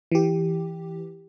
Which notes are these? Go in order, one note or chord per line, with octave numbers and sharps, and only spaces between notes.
E3 G4